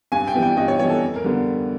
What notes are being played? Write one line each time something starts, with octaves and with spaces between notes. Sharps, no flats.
G2 G#5
G5
E3 G3 B3
G5
G2 D#5
C#5
E3 G3 B3 C#5
A4
F2
A#4
D3 G3 B3